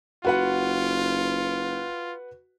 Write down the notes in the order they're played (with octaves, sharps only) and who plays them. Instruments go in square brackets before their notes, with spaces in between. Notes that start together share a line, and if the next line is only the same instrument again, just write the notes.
[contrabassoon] F#1 [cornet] F4 [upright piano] F#4 B4 F#5